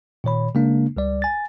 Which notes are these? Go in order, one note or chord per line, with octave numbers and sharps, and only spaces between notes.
A#2 D#3 C#5 B5
C#3 G#3 A#3 D4
C#2 G3 D5
G#5 A6